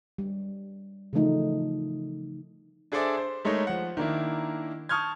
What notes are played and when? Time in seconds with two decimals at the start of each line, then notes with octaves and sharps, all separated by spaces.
0.18 G3
1.13 C#3 E3 F3 A3 D#4 F4
2.92 D4 G#4 A4 C5 D5 E5
3.17 C5
3.45 G#3 A3 D#4 A#4 C#5
3.67 F3 F#5
3.97 D#3 A#3 D4 E4
4.89 A5 C#6 D#6 F6 G6 G#6